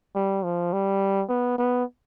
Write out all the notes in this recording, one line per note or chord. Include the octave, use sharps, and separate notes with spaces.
G3
F3
G3
B3
B3